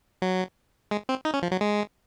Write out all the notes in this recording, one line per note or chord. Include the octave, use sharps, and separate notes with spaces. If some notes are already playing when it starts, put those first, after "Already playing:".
F#3
G#3
C4
D#4
C#4
F3
F#3
G#3